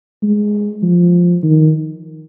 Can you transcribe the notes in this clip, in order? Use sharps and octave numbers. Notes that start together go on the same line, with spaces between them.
G#3
F3
D#3